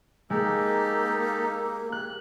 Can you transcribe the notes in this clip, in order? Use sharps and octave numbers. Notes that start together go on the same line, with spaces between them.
G#3 A#3 D#4 G4 A4
G4 F#6